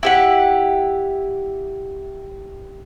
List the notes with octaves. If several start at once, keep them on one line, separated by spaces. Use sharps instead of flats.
E4 G4 F#5